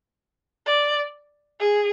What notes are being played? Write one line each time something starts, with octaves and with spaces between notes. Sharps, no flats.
D5
G#4